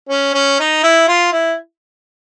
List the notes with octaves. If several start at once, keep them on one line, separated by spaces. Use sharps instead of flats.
C#4
C#4
D#4
E4
F4
E4